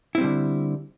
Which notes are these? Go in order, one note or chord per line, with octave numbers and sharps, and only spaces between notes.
D3 G3 C4 E4